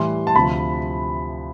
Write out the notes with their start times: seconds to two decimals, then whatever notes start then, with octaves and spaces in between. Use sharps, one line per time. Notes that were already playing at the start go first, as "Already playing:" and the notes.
Already playing: A2 E3 G3 C6
0.27 A5
0.35 D2 C3 F3 B5